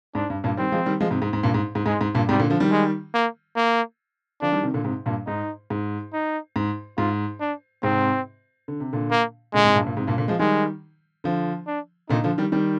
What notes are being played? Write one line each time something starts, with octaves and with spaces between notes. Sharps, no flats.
G#2 D4
G2
G2 A#2
D#3 G3 C4
F3 G#3
D#3 G3
F3 G#3
G#2 C3
G#2
G#2
G2 A#2
G#2
G#2
G#2 G#3
G#2
G2 A#2
G#2 C3 G3
A#2 D3
D3 F3
D#3 G3
G#3
A#3
A#3
D3 F3 D4
D#3 G3
C3 D#3
A#2 D3
G#2 C3
G2 A#2
G#2 D#4
G#2
D#4
G#2
G#2 F4
D4
G#2 C3 C4
D3
C3
A#2 D3
A#3
A#2 D3 G#3
G#2 C3
G2 A#2
G2 A#2
G#2 C3
G2 A#2
A#2 D3
F3 G#3
D#3 G3 G#3
D3 F3
D4
A#2 D3 D#4
D3 F3
D#3 G3
D#3 G3